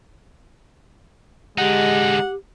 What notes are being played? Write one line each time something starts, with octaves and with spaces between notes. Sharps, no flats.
D3 G#3 D#4 G4 F#5